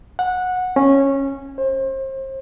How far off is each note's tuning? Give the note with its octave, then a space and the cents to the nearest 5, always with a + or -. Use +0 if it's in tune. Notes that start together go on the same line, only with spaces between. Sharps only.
F#5 -15
C#4 -15
C5 +35